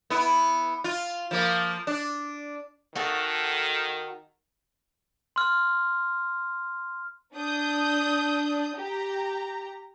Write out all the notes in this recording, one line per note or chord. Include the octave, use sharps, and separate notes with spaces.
B3 E4
F4
F3 A#3
D4
D#3 D#4 F#4 A4
C6 F6
D4 D#6 G6
G4 A#5